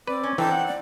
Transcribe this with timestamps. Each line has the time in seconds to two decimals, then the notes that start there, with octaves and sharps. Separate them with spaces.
0.08 C4 B4 D5
0.23 C#4
0.38 E3 C4 D#4 A4 G5
0.51 F#5
0.67 D5